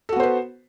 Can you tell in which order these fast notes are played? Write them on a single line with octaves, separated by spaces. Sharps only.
A4 F#4 B3 C5 B4